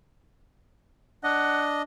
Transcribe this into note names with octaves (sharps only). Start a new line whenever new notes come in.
D4 D#5 F#5